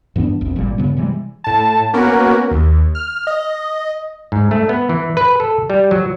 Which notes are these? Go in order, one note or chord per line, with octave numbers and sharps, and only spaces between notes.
G2 E3 B3 D4
A#1 F2
G#1 A#2 G3
G2 C#3 B3
C3 E3 G3 G#3
A2 A5
A#3 B3 C#4 F#4 A#4
D#2
F6
D#5
G#2
A3
B3
E3
B4
A4
G3
F#3